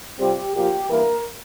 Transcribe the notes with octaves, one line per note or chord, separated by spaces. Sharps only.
C3 G3 C4 F4 G4
A#2 F3 A#3 F4 G4
G2 E3 A#3 E4 A#4